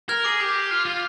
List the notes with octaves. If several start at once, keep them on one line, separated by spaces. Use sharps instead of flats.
A#4 F6 G#6
G#4 D6
G4
F4
F4